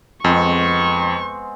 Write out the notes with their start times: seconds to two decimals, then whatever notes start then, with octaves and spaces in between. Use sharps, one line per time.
0.24 F2 G#3 B3 C4 C#6